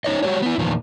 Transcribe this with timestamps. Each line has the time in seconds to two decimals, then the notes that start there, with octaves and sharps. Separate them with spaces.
0.04 C#4 D#4 C#5 D#5
0.22 G3 F#4 G4 C#5
0.42 B3 E4
0.58 E2 A#2 D#3 F3